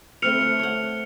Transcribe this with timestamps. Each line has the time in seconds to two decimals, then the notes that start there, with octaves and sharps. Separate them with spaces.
0.22 A3 C4 B4 F6 C#7 F7
0.41 A3
0.59 C#5 F#5